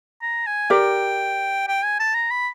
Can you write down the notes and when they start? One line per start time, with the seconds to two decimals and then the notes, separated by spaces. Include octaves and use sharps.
0.22 A#5
0.47 G#5
0.70 G4 A#4 D5 G5
1.68 G5
1.83 G#5
2.00 A5
2.15 A#5
2.31 B5